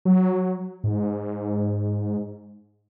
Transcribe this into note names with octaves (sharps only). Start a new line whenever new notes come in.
F#3
G#2